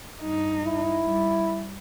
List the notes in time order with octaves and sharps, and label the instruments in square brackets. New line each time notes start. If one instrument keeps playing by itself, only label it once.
[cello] G2 D#4
[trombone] E4
[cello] G3